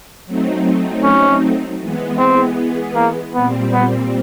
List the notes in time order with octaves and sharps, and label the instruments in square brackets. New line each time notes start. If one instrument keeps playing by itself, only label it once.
[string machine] F#3 A3 C4 D#4
[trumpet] C#4
[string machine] E3 G#3 B3
[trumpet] C4
A#3
[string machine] A#2 G3 C4 [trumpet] B3
[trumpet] B3